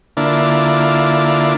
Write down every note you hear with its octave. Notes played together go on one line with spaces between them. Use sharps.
D3 A#3 D4 E4 F4